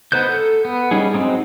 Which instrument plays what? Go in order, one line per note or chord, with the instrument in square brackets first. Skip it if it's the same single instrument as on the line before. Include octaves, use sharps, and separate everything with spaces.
[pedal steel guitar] B3 D#4 C5 F#6 G6
A4
B3
G3 C#4 D#4 G#4
F#3 G#3 C4 D#4